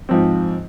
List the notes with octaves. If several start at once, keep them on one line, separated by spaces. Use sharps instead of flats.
G#2 F3 C4